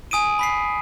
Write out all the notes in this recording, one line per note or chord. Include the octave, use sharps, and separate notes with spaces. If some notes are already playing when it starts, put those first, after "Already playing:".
G#5 D#6 D7 D#7
B5 B6 C7